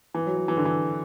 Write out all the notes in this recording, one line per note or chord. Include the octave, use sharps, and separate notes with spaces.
E3
F#3
F#3
E3
D3
E3